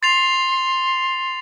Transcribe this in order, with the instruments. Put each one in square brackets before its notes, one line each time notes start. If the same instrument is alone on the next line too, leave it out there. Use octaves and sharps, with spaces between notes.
[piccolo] C6 [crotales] A6 C7 F7